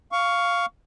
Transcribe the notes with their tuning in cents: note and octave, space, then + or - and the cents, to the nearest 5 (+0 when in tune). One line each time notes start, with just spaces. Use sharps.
F5 +0 C#6 +15